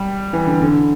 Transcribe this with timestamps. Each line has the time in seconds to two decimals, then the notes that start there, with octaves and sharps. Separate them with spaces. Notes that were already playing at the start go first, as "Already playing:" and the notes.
Already playing: G3
0.33 E3
0.47 D3
0.61 D3